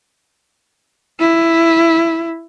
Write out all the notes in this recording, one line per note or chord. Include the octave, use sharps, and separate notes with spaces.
E4